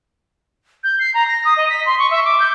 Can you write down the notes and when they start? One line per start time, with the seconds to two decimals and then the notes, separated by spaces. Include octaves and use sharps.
0.84 G6
1.00 C7
1.14 A#5
1.28 A#6
1.45 D#6
1.57 D#5
1.70 B6
1.86 C6
1.99 C#6
2.11 E5
2.25 D6
2.40 G6